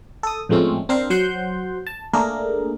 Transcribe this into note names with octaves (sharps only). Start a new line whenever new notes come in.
A4 D#6
A2 F3 G#3 A3 C4 C#4
C4 D4 A#4 C5 F5
F#3 C5 F#5 C6 G6
A5
A3 A#3 D4 G#4 A#4